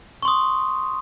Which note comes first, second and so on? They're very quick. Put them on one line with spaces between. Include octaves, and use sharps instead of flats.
C#6 C6 D#6